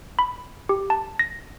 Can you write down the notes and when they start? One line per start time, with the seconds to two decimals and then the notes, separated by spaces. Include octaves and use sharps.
0.19 B5
0.69 G4
0.90 A5
1.19 A#6